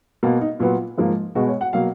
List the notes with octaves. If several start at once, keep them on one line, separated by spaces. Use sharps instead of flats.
B2 A#3
D#4
A#2 F#3 B3 F4
G#2 F3 A#3
B2 G#3 B3 F#4
C#5
F#5
B2 F#3 A#3 F5